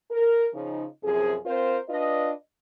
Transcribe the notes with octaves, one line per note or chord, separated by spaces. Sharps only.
A#4
C#3 F3 D#4
F#2 C3 F3 G#4
C4 F4 A#4 C5
D4 F4 B4 D5 D#5